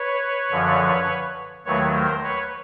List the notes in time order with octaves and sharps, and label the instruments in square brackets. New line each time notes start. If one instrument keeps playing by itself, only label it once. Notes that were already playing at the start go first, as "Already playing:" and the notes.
Already playing: [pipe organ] B4 C#5
F#2 D3 F3
D#2 D#3 F#3 A3 B4 C#5
A#4 C5
B4 C#5